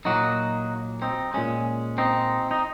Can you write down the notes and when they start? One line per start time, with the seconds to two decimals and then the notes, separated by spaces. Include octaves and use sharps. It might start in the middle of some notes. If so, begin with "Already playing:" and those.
0.05 A#2 F#3 A#3 D#4 F#4
1.02 C4 D#4
1.34 A#2 G#3 C#4
1.98 C4 D#4
2.51 D#4